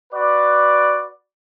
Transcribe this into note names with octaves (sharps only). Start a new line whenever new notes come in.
F#4 B4 D5